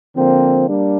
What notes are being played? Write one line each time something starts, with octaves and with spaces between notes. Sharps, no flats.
D3 F3 A#3 C4
G3 A#3 D4